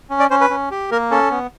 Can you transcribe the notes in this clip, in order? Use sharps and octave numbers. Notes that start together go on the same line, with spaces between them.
C#4
D5
C#4 C5
B4
C#4
G4
A#3 A#4
C#4 A4
B3